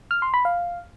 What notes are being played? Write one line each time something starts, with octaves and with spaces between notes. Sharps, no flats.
F6
C6
B5
F5